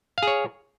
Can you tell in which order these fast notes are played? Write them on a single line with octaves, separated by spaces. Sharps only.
F5 G#4 C#5